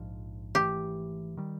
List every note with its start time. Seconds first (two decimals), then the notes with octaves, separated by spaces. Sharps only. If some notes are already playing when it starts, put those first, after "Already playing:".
Already playing: A#1 G#2 F3
0.55 G#1 G#2 E3 A3 G4
1.37 D#3 G3